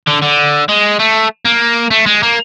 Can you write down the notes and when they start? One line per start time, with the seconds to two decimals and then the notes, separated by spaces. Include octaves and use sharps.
0.07 D3
0.22 D3
0.69 G#3
0.99 A3
1.45 A#3
1.91 A3
2.06 G#3
2.23 A#3